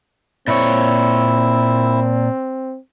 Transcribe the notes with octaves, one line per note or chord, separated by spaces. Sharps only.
A#2 C4 E4 C#5